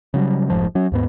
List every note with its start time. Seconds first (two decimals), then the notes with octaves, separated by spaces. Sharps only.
0.14 C#3 F#3 G3
0.50 F1 C2 G#2 F3
0.75 F#3 C#4
0.92 D#2 G#2 B3